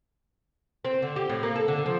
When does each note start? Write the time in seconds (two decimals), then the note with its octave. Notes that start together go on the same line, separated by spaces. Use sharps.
0.85 C4
1.02 D3
1.16 G4
1.29 A2
1.43 A#3
1.56 A4
1.68 D3
1.86 F3